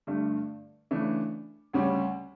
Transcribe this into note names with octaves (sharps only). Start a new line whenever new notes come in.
G2 D3 A3
C#3 E3 A3 D4
D2 C#3 G3 C#4